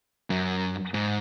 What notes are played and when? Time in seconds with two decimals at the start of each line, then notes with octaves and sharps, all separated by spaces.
0.30 F#2
0.94 G#2